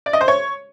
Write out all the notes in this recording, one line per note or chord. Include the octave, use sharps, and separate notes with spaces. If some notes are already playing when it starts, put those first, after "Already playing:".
D5
D#5
C5
C#5